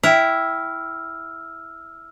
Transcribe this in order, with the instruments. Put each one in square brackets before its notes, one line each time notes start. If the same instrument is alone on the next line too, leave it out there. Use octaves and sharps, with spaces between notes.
[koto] E4 [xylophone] G5 F7 [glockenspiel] E6 F6